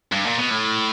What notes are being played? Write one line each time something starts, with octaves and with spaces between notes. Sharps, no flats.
G2
A#2
B2
A2